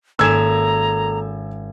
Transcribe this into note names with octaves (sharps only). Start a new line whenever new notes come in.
G#1 A#3 C#4 A4 A#5 E6 G#6 E7